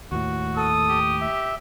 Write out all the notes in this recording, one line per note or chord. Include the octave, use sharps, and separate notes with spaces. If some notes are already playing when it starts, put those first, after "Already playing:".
D#2 A2 F#4
A4 D#6
G4
E5